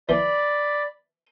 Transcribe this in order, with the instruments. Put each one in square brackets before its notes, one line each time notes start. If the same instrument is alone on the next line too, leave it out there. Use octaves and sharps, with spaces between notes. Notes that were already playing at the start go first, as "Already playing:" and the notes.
[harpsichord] E3 [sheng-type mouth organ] D5 B5